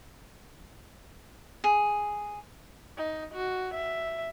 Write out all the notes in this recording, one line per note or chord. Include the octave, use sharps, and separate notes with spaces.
G#4
D#4
F#4
E5